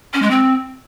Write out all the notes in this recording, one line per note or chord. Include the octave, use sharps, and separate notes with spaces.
C#4
G#3
C4